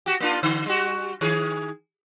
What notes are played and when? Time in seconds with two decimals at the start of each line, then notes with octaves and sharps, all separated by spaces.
0.06 F#4 G4
0.20 A#3 D4 F4
0.43 D3
0.66 G3 F#4
1.21 D#3 G#4